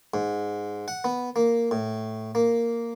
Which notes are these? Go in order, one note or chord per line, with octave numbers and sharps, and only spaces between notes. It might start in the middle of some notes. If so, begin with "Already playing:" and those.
G#2
F#5
B3
A#3
A2
A#3